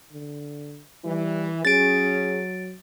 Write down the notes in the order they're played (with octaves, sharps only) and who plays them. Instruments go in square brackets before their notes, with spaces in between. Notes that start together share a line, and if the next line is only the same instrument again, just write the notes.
[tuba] D3
[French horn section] E3 [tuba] G3
[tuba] F#3 [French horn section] C#4 G#4 [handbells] A6 D7